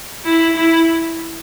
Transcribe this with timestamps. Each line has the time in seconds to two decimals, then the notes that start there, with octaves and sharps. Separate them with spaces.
0.25 E4
0.56 E4